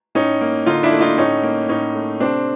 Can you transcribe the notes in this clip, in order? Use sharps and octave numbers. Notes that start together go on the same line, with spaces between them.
A2 C#4 D#4
A#3
D3 D#4 F4
D4 E4
A3
D#4 F4
A2 C#4 D#4
A#3
A2 C#4 D#4
A3
C3 C4 D4